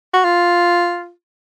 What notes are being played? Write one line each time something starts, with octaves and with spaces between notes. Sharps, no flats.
F#4
F4